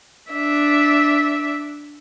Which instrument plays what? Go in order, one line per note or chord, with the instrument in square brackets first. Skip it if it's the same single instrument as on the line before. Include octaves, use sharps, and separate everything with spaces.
[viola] D4 E5